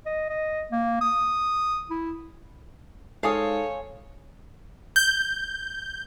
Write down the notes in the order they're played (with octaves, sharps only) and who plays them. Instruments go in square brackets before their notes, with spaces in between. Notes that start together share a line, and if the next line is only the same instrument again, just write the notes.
[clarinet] D#5
D#5
A#3
D#6
E4
[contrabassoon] G#2 [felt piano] A4 [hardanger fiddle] C5 C#5 [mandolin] F5 G#5 D#6
[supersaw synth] G6